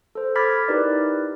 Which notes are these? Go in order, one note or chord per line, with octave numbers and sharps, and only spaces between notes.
A4 C5
B5 D6 F6 G#6 A6 B6
D#4 E4 G4 A#4 B4 D5